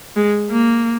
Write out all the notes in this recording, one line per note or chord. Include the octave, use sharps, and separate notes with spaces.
G#3
A#3